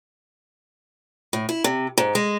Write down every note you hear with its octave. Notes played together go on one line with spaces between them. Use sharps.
A2
E4
C3
G#2
G#3